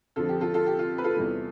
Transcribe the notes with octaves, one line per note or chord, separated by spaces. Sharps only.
F2 D3 F3 F4 A4
G4
F4 A4
F4 A4
G4
F4
B4
F4 A4
E2 C3 E3 G3